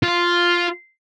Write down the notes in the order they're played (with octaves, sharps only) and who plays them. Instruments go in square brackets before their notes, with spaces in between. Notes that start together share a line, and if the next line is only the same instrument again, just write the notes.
[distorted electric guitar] F4